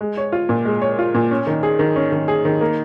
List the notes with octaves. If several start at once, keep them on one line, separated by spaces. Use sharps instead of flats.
G#3
C#5
F4
A#2
G#3
C#5
F4
A#2
C#4
D#3
G#4
D#3
C#4
D#3
G#4
D#3
A#3